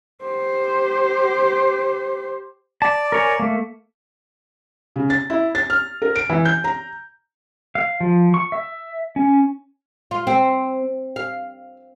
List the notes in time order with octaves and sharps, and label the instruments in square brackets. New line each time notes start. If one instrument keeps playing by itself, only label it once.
[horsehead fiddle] G4 C5
[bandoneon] D5 [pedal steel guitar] A5
[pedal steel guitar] A#4 C#5 G#5
A3 A#3
[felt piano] C#3
A6
E4
A6
F6
A#4
D7
E3
G6
A#5
[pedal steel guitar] F5
F3
C#6
E5
C#4
[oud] F4
C4
F5